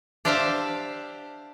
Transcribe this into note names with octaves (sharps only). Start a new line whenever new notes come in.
D4 G4 C5 E5 F5 A5